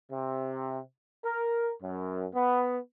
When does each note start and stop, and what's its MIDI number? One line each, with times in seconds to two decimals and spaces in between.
0.12 0.80 48
1.25 1.72 70
1.83 2.26 42
2.35 2.79 59